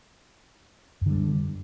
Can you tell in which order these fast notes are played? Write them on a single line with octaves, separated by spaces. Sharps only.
F#2 D3 G3